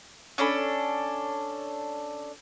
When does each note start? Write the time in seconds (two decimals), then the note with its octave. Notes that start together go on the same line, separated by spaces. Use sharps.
0.38 C#4 D4 A4 B5